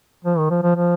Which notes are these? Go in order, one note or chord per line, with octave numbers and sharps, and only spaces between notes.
F3
D#3
F3
F3
F3